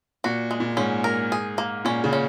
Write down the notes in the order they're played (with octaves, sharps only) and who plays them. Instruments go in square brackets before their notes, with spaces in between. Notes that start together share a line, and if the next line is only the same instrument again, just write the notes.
[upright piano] A#2 [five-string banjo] F#4
[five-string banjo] G#3
[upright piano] A#2
[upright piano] G#2 [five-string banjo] C#4
[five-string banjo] A#4
G#4
A#3
[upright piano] A#2 [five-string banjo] C#4
[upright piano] C#3
[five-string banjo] C#4